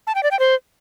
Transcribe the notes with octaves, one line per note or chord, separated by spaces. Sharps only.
A5
G5
D5
G5
C5